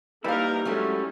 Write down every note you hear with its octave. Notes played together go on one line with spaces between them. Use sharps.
G3 A#3 D#4 E4 A#4 B4 F5
F#3 G#3 A3 C#4